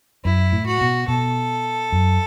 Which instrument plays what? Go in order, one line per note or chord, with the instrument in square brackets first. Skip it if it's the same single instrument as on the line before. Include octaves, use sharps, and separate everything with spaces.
[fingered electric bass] F#2 [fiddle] E4
[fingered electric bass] A2
[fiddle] F#4
[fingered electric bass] B2
[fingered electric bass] B2 [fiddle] A4
[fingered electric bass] F#2